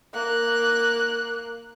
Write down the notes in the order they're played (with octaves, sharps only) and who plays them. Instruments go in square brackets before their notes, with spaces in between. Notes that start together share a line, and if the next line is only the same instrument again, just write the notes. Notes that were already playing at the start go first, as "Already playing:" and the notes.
[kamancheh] A#3 F#6